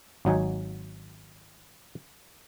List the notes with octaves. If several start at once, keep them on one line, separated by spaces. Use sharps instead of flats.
G#1 F#3 D#4 G#5